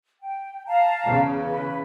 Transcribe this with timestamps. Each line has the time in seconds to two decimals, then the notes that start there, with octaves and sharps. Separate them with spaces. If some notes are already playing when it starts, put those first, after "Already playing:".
0.20 G5
0.67 F5 A5 A#5
1.06 E2 C#3
1.48 B4